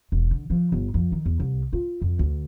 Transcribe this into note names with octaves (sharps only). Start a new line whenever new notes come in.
E1
D3
F3
G1
F2
D#3
E2
C2
F4
F2
D2